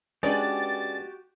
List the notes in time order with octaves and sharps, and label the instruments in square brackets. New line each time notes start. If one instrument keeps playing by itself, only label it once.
[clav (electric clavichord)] G#3 [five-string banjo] C#4 D4 B4 [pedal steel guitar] F#4 G4 [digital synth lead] A6